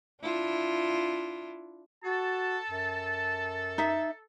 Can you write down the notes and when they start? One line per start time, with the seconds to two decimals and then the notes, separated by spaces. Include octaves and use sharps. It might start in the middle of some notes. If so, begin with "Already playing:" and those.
0.22 D4 E4 F4
2.04 F#4 A4 A5
2.69 F#2
3.78 D#4 E5